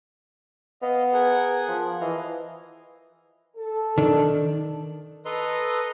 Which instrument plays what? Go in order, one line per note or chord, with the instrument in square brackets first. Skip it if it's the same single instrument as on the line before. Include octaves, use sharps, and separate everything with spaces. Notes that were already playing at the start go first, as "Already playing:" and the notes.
[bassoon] B3 [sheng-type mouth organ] D#5 F5
[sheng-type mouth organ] G#4 A#4 F#5
[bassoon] F3
[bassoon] E3 [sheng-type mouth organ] D#5 F5
[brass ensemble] A4
[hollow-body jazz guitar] D#3 D4
[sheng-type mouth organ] A4 B4 D#5 A#5 C6